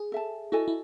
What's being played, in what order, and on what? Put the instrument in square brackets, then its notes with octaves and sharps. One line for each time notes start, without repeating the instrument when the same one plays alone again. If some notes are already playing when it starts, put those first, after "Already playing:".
Already playing: [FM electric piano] G#4
[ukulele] A4 E5 A5
[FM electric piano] E4 [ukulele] F#4 A4 D#5 G#5
[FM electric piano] E4